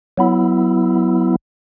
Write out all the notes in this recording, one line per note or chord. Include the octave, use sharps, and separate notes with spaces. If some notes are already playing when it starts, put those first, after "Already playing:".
F#3 B3 E4